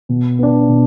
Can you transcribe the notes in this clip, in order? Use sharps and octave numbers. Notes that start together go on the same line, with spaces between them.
B2
B3 D4
B2